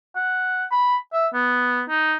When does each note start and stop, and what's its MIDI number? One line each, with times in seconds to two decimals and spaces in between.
0.16 0.65 78
0.72 0.97 83
1.13 1.27 76
1.34 1.82 59
1.89 2.16 63